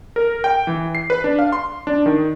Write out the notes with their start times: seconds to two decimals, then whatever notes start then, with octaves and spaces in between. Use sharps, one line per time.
0.16 A#4
0.44 G5
0.67 E3
0.95 C7
1.10 B4
1.24 D4
1.39 F5
1.52 C6
1.87 D4
2.06 D#3